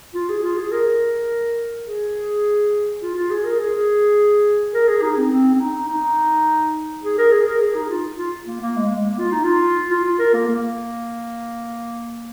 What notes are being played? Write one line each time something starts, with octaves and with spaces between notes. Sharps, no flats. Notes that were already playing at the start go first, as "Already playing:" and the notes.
F4
G#4
F4
G#4
A#4
G#4
F4
F4
G#4
A#4
G#4
A#4
G#4
D#4
C4
C4
C4
D#4
D#4
G#4
A#4
G#4
A#4
G#4
D#4
F4
F4
A#3
A#3
G#3
G#3
A#3
F4
D#4
F4
F4
F4
A#4
A#3
A#3